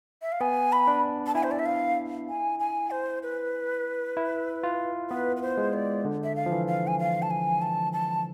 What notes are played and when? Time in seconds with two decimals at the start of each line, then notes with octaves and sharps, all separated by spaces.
0.22 E5
0.32 F5
0.41 B3 G#5
0.72 B5
0.87 D4
1.26 A5
1.35 E4 G#5
1.43 C5
1.51 D5
1.59 E5
1.66 F5
2.29 G#5
2.59 G#5
2.91 C5
3.23 B4
4.17 E4
4.63 F4
5.10 B3 B4
5.36 B4
5.42 C5
5.57 G#3
5.73 D5
6.05 D3
6.24 E5
6.35 F5
6.46 F3
6.51 E3
6.67 F5
6.87 G#5
6.99 F5
7.22 A5
7.30 G#5
7.62 A5
7.93 A5